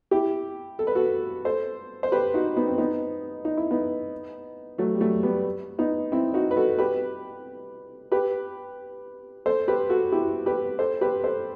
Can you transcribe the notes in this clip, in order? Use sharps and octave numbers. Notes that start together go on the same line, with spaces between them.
E4 G4
A4
B4
F#4 A4
A4 C5
C5
G4 B4
D#4 F#4
B3 D#4
C4
B3 D#4
D#4
E4
B3 D#4
F#3 A3
G3
F#3 A3
G3 B3
B3 D#4
C4 E4
D#4 F#4
B4
F#4 A4
G4 B4
G4 B4
A4 C5
G4 B4
F#4 A4
E4 G4
G4 B4
A4 C5
G4 B4
A4 C5